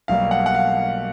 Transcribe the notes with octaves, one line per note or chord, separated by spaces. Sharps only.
B1 B2 G3 A#3 F5
F#5
F#5
F5